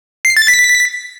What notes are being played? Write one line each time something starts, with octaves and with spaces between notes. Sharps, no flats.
C7
A6
B6